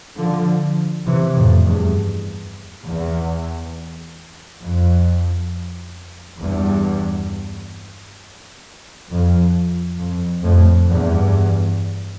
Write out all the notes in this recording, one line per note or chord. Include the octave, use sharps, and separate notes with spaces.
D3 F3
C3 E3
F2 A2
E2 G2
E2
F2
E2 G2
F2
F2
F2 A2
E2 G2